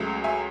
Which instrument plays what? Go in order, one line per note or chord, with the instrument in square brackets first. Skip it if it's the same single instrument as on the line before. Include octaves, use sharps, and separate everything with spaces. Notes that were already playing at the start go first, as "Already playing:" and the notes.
Already playing: [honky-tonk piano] C#2 C#3 F#3 A3
E5 G#5